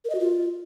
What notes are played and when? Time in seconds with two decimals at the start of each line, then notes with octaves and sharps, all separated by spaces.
0.05 A#4
0.10 D#5
0.15 F#4
0.20 F4